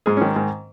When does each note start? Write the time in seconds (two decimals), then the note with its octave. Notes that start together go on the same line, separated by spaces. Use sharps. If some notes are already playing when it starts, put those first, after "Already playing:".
0.06 G#2 G#4
0.17 D#3 C#4
0.36 G#2